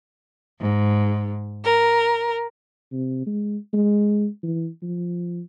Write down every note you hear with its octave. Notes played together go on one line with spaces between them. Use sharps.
G#2
A#4
C3
G#3
G#3
E3
F3